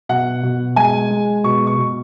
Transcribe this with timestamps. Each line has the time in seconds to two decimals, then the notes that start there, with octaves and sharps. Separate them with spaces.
0.09 B2 F#5
0.43 B2
0.76 G#3 G#5
1.10 G#3
1.44 B2 C#6
1.67 C#6
1.78 B2